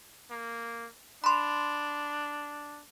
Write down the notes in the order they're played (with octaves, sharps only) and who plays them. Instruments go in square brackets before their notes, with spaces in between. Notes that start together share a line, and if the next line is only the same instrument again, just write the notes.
[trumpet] A#3
[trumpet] D4 [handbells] B5 C6